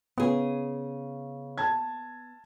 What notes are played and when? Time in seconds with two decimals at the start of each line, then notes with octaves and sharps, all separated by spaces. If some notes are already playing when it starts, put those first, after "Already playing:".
0.18 C#3 B3 G#4
1.58 A5 G#6